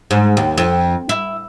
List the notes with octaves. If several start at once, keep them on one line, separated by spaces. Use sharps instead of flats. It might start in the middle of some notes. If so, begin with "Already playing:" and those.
G#2
D#2
F2
E4